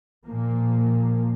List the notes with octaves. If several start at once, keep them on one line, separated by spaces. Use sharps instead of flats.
A#2 F3 A#3